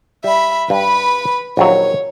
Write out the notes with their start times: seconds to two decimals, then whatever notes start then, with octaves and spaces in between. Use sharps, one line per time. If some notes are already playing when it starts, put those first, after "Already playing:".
0.24 G3 E5 B5
0.70 G2 G3 B4 B5
1.57 A#1 D#2 F#3 C#5